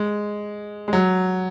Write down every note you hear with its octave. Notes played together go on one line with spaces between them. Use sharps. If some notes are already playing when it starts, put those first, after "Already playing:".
Already playing: G#3
G#3
F#3